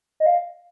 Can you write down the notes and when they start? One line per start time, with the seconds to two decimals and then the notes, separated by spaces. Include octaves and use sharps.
0.20 D#5
0.26 F5